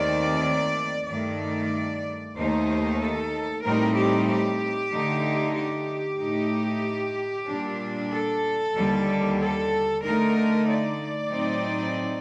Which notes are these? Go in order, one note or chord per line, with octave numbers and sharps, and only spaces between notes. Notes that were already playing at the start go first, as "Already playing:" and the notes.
Already playing: D#2 D#3 A3 C4 D5
G2 D#3 A3 D5
D#2 D#3 A3 D#4 C5
A4
A2 G3 C4 D#4 A#4
G4
G4
D3 A3 D#4
G4
A2 A3 D#4
A#2 G3 D4
A4
D#2 D3 G3
A4
D3 A3 D#4 A#4
D5
A2 F#3 C4 D#4